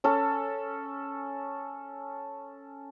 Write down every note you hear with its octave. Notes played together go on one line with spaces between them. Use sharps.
C#4 A4